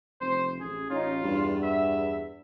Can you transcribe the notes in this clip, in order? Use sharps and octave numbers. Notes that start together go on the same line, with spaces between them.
F1 C5
A1 G#4
A1 C#4 D#4 F4
E2 G2
E5